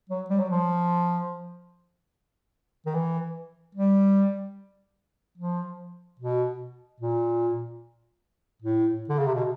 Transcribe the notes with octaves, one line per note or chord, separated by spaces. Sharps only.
F#3
G3
F#3
F3
D#3
E3
G3
F3
B2
A#2
A2
D3
C#3
C3
B2